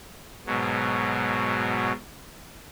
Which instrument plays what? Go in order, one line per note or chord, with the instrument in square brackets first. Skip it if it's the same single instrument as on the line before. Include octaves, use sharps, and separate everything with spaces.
[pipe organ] G#2 B2 F#3